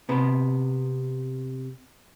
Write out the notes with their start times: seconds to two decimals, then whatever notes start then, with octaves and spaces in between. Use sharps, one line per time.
0.09 C3 B3